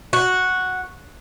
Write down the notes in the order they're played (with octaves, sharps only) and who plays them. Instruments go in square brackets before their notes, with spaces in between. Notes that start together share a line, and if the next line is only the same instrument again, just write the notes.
[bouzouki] F#4